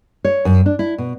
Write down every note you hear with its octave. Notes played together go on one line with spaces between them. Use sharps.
C#5
F#2
D4
E4
B2